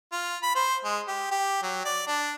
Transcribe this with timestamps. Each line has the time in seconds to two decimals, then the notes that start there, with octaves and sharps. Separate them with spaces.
0.12 F4
0.42 B5
0.55 C5
0.84 G#3
1.08 G4
1.31 G4
1.62 F#3
1.85 D5
2.07 D4